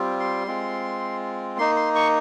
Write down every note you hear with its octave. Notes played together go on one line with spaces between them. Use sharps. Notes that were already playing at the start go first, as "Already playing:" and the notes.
Already playing: G3 C4 F4
C6
G#3 C4 F4
A#3 D#4 C6
C6
C#6